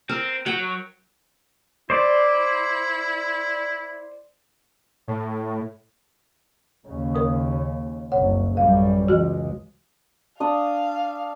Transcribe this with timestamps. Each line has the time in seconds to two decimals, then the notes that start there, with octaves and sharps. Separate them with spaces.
0.09 C4 A#4
0.46 F#3 F#5 G5
1.90 E4 C5 D5
5.08 A2
6.86 D#2 C#3
7.15 A#4 D#6
8.12 F#1 C2 C#5 F#5
8.57 A1 F#2 G3 F5
9.08 C#2 E3 G#3 F#4
10.40 D4 F5 D#6